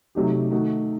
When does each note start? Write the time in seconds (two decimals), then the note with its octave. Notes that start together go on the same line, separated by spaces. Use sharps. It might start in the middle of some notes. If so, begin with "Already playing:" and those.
0.15 C3 F#3 A3 D#4 G4
0.52 D#3 A3 D#4 F#4